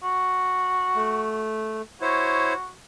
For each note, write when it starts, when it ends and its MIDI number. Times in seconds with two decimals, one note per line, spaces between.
0.03 1.50 66
0.96 1.82 57
2.02 2.53 64
2.02 2.71 66
2.02 2.53 72
2.02 2.53 73